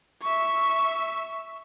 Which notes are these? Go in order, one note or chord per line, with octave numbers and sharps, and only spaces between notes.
E5 C#6